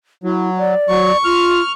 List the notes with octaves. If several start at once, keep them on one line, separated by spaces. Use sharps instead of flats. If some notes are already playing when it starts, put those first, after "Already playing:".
F#3 E4
D5
F#3 C#6
F4 F6